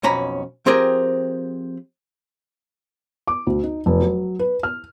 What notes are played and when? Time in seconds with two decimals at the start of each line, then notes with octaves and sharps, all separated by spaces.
0.03 B1 F2 C#4 A#5 B5
0.66 F3 C4 G4 G#4 A#4
3.27 D6
3.47 D2
3.64 D#4
3.86 F1
4.00 F#3
4.39 B4
4.63 F6